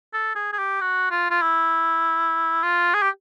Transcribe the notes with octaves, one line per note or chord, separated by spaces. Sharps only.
A4
G#4
G#4
G4
F#4
F4
F4
E4
F4
G#4
G4